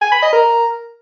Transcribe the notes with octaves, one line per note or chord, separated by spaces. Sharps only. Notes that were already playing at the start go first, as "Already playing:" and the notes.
G#5
B5
D#5
A#4